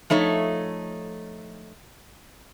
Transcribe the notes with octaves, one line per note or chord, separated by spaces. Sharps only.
F3 A3 D#4 C#5